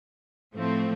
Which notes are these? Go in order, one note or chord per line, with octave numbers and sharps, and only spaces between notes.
A2 F3 A3 C4